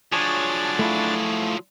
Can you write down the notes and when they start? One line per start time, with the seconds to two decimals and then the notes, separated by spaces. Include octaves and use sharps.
0.13 F3 F#3 D4 G#4 C#5 A6
0.79 A3 E4 F4